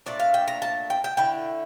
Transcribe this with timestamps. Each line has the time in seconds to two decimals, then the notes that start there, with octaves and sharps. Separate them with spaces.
0.06 A#2 A3 D4 D5
0.20 F5
0.34 G5
0.48 A#5
0.62 A5
0.90 G5
1.04 G5
1.17 D3 A3 E4 G5